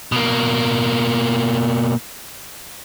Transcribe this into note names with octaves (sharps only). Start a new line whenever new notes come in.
B2 A#3